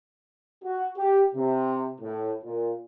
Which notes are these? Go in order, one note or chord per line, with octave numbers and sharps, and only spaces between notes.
F#4
G4
C3
A2
A#2